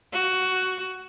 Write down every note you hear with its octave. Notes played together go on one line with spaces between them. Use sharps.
F#4